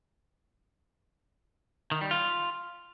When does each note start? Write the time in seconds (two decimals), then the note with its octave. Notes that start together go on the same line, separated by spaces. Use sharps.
1.91 D#3
2.01 G3
2.11 F4